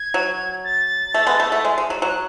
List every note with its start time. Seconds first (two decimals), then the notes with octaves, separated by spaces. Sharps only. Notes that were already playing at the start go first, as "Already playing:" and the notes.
Already playing: G#6
0.14 F#3
0.64 A6
1.14 A3
1.27 G#3 B3
1.40 A3
1.52 A3
1.65 G#3
1.78 G#3
1.90 F#3
2.02 F#3
2.08 F#6